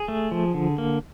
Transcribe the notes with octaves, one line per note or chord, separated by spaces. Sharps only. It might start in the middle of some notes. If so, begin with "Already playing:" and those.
Already playing: G#4
A3
F3
D3
A#3